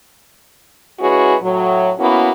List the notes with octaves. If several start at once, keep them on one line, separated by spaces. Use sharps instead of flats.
G#3 C#4 E4 F#4 G#4 B4
A2 F#3
A#3 B3 C#4 E4 F#4